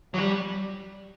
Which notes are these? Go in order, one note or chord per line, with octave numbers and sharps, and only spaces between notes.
F#3
G3